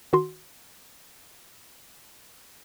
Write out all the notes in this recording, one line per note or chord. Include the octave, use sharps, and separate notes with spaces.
D#3 F#4 C6